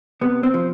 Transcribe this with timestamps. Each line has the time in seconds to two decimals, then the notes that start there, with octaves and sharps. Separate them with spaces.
0.21 C3 B3
0.43 C4
0.54 F3